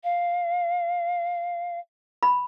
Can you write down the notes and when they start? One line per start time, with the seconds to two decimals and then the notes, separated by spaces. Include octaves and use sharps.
0.04 F5
2.23 B5